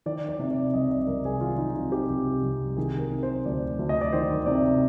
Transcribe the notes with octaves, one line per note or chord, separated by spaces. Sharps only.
D#3 D5
D5
C3
D5
C2 D#5
D5
C2 A#4
G#4
D#3 F4
D#4
C3 F4
G4
C2
C2
D#3 G#4
A#4
C3
C5
D2 D5
D2
D#5
D5
D#3 C5
C3 D5